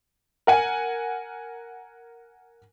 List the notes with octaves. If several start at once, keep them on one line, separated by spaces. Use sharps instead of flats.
A#4 F#5 G#5